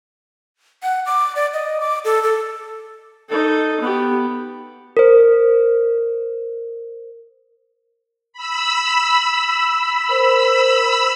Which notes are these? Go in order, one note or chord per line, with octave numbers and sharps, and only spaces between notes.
F#5
D6
D5
D#5
D6
A4
A4
D#4 A4
B3 G4
A#4 C5
B5 E6
A#4 C5